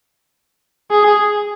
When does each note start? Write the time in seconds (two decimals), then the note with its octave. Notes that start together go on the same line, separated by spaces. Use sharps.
0.91 G#4